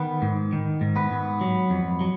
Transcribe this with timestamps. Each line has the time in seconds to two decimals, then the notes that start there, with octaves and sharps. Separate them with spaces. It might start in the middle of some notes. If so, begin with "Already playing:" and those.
Already playing: D#3 B3 B4
0.22 G#2
0.52 D#3
0.81 G#2
0.96 B3 B4
1.11 G#2
1.41 F#3
1.70 F2
2.01 F#3